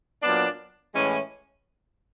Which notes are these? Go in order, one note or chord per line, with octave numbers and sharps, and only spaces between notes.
A#2 F#3 B3 D4
A2 E3 G#3 C#4